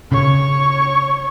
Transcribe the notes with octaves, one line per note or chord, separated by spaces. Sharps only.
C#3 C#5 C#6